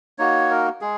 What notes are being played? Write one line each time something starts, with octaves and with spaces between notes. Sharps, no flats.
A#3 D#4 F#4 C#5
A#4
G#3 G#4